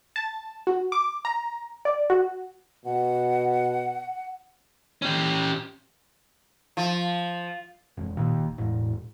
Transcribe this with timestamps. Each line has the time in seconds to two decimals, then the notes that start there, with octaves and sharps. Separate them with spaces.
0.16 A5
0.67 F#4
0.92 D6
1.25 A#5
1.85 D5
2.10 F#4
2.85 B2 F#5
5.02 C#4 G4
6.77 F3
7.97 E1 F2
8.17 D#2 A#2
8.38 D#1
8.58 E1 A2